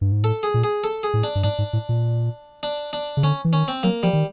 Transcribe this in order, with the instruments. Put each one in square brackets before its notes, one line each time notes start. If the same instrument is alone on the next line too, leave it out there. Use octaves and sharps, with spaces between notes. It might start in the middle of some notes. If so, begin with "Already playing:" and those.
[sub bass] G2
G#2
[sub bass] A2 [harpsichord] A4
[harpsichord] G#4
[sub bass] A#2
[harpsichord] G#4
A4
G#4
[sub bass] A2
[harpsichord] D4
[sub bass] G2
[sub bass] G#2 [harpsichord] D4
[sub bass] G#2
A2
A#2
[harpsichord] D4
D4
[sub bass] C#3
[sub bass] D3 [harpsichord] C#4
[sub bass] E3
[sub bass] D#3 [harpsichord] C#4
[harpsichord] C4
[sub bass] F#3 [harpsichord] A#3
[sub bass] F3 [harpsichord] G3
[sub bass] D#3